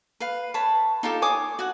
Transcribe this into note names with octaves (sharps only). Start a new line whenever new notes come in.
B4 F5
C#5 A5 B5
D#4 F4 G4 A4
C#5 G#5 D6 D#6
F#4 F#5